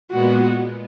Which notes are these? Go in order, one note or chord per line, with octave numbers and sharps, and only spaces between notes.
A#2 G#3 B3 F#4